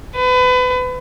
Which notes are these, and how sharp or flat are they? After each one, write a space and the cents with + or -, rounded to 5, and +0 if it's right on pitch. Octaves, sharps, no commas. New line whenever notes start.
B4 +30